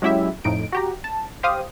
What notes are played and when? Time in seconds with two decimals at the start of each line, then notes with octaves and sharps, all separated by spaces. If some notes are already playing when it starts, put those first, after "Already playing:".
0.02 F#3 G#3 C#4 E4 G4 E5
0.44 F2 A2 D#4 D7
0.72 F#4 G4 A#5
1.04 A5
1.43 G4 C5 F5 D#6